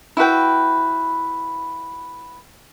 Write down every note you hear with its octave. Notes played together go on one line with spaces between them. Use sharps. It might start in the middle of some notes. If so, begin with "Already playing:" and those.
E4 F#4 B4 G5